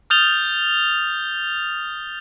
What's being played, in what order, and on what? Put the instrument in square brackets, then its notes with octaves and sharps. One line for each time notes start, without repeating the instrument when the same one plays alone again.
[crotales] D#6 F6 G6 A6 F7 G7